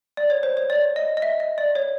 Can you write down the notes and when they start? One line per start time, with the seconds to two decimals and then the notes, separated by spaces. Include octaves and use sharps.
0.17 D5
0.30 C#5
0.43 C5
0.57 C#5
0.70 D5
0.96 D#5
1.17 D#5
1.22 E5
1.40 D#5
1.58 D5
1.75 C#5